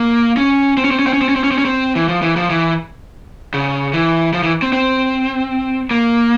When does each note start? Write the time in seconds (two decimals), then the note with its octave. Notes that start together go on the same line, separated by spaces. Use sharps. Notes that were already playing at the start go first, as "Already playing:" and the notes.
Already playing: A#3
0.37 C#4
0.77 C4
0.84 C#4
0.91 C4
0.99 C#4
1.07 C4
1.13 C#4
1.21 C4
1.29 C#4
1.35 C4
1.44 C#4
1.51 C4
1.58 C#4
1.65 C4
1.95 E3
2.08 F3
2.22 E3
2.36 F3
2.50 E3
3.54 C#3
3.93 E3
4.33 F3
4.43 E3
4.62 C4
4.72 C4
5.91 A#3